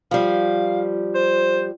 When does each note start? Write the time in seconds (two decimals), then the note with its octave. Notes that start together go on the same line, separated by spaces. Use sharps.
0.11 F3 G3 F5
1.15 C5